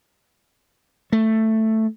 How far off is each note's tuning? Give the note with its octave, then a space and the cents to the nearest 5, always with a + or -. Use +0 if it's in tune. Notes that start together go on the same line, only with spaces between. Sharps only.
A3 +5